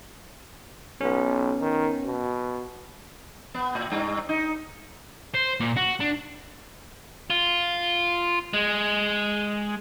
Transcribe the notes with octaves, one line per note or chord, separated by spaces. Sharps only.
B1 B3 C#4
D#3
B2
B3
A2
G2
D#4
C5
A#2
F#4
D4
F4
G#3